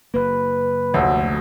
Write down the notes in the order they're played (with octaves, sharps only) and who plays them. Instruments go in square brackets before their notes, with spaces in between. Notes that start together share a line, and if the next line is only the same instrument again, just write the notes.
[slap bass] F#1 A#3 [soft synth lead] B4
[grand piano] F1 D2 [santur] F#3 A4 F#5